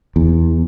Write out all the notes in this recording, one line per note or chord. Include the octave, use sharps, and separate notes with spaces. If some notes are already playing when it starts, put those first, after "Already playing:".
E2